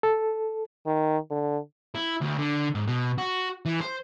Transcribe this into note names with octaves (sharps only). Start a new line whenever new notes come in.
A4
D#3
D3
E4
D2
D3
G#2
B2
F#4
E3
C5